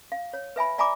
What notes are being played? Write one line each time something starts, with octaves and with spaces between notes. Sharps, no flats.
F5
C#5
B4 E5 G#5 B5
D5 E5 G#5 A#5 B5 D6